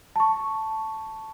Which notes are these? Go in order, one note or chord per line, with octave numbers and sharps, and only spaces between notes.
A5 C#6